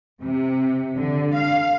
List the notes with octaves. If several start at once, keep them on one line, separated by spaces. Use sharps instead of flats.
C3
D3
F5